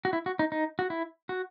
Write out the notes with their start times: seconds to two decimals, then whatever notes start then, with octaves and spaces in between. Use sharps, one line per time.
0.05 F#4
0.13 E4
0.26 F#4
0.39 D#4
0.52 D#4
0.79 F#4
0.90 E4
1.29 F#4